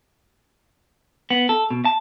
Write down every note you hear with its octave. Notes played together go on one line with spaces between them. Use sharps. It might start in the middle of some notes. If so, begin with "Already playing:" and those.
B3
A4
B2
A5